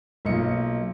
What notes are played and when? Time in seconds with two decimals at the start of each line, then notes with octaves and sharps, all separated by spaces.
0.25 B1 A#3 F4 D#5 C#7